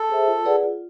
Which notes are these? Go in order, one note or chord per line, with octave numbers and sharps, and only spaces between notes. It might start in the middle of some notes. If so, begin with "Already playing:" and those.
Already playing: A4
G#4 C5 E5
F4
G#4 B4 D5 F#5
F4